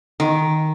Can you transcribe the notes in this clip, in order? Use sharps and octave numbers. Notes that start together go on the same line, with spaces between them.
D#3